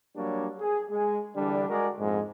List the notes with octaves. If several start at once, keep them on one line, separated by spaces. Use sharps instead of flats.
F#3 G3 A#3 D4 C#5
G#4
G#3 G#4
D3 E3 G3 D4
G#3 F#4 G#4 A#4 D5
A#1 F2 G#2